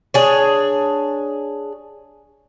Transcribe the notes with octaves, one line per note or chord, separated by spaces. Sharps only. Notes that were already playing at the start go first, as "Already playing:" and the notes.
D4 G#4 C#5